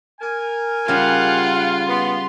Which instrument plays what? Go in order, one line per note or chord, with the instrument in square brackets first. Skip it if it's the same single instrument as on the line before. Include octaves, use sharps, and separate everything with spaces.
[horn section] A#4 G#5
[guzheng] C#3 G3 [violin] F4 [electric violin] F5 F#5
[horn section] B3 [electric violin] C6